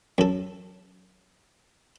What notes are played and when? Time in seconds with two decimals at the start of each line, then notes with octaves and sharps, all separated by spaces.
0.18 F#2 A4